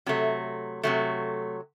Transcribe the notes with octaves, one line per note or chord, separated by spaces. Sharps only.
C3 F#3 A3
C3 F#3 A3